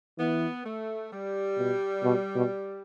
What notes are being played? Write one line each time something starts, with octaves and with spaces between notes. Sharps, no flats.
E3 B3
A3
G3
B2
B2
B2